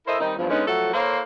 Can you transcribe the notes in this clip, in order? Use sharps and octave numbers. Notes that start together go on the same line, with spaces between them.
E4 A4 A#4 C5 D#5 E5
D#3 G3 C4 D#4
E2 G2 F3
D3 G#3 B3 C#4 D#4
F3 F#3 A3 A4 C#5 F#5
A#3 E4 A4 C5 C#5 F5